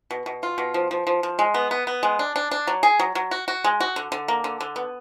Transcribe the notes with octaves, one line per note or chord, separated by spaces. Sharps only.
B2
B2
F4
B2
F3
F3
F3
F3
G#3
B3
B3
B3
G#3
D4
D4
D4
F#3
G#4
F#3
F#3
F#4
F#4
G#3
F#4
D3
D3
A#3
D3
D3
B3